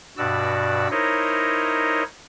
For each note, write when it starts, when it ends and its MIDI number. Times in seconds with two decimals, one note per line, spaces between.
0.17 0.88 43
0.17 0.88 47
0.17 0.88 66
0.17 0.88 74
0.17 0.88 88
0.91 2.03 63
0.91 2.03 64
0.91 2.03 70
0.91 2.03 72
0.91 2.03 73
0.91 2.03 75